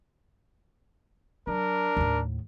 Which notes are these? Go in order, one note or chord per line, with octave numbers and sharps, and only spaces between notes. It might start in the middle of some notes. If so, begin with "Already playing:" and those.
F#3 D4 A#4
D#2 A2